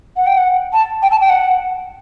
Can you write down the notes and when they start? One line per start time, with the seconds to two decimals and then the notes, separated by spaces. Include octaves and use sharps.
0.17 F#5
0.27 G5
0.38 F#5
0.73 A5
1.02 G5
1.11 A5
1.21 G5
1.29 F#5